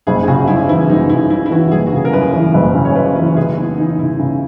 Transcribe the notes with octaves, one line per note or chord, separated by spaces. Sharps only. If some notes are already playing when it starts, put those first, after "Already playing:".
F#1 G#4
G#4
C#3 F#4
F#2 E4
E3 E4
F#1 D#4
C#3 E4
F#2 E4
E4
E3 F#4
F#1 G#4
F#4
C#3 G#4
A#4
F#2 B4
E3
F#1 B4
C#3
C#5
F#2 B4
E3 B4
C#3 G#4
B3 E4
E3 D#4
C#3 E4
C#3